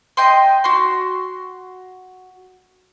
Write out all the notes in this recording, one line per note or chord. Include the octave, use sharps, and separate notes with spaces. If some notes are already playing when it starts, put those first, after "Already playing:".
D#5 G5 C6
F#4 C6